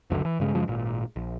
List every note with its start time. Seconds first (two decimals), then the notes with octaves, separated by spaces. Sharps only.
0.10 F1 C#2 F#2 D3
0.25 E3
0.40 G2 C#3 G#3
0.54 F#2 C#3 F3 G#3
0.68 G#1 A#2
1.16 A#1